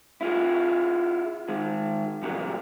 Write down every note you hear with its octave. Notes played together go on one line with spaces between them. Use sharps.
E4 F4 G#4
D#3 G#3
A#2 C#3 E3 F#3 G3 A#3